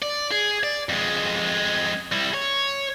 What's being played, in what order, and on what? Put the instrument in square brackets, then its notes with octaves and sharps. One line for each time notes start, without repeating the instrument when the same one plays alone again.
[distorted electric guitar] D5
G#4
D5
F2 G#3
G3 E4
C#5